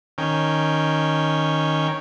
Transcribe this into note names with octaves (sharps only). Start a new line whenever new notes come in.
D#3 C#4 G5